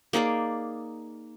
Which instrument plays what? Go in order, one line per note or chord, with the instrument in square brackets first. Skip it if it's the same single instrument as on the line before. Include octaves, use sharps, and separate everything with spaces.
[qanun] A#3 D#4 G#4 D5